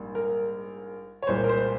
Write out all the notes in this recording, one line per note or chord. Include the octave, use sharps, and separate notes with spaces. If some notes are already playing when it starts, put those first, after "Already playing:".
Already playing: A#1 G#2 G3 A#3
A#4
C#5
C2 A#2 G#3 C5
A#4
C5